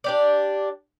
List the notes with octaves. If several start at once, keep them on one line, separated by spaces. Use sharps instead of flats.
D4 G4 D5